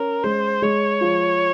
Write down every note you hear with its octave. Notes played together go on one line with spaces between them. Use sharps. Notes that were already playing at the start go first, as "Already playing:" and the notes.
Already playing: C#4 A#4
G#3 C5
G#3 C#5
F3